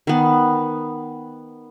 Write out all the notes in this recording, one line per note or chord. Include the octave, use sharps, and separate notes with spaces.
D#3 B3